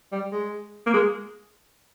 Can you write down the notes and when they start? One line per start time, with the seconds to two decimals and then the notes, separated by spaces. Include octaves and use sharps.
0.12 G3
0.32 G#3
0.87 A#3
0.94 G#3